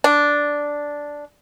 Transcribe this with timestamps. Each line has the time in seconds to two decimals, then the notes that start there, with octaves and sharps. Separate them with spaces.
0.04 D4